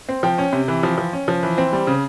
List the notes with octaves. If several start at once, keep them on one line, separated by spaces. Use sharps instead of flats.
C4
F3 G5
C#4
C3
E3
F3
F3
C#4
F3
E3
C4
G3
C#3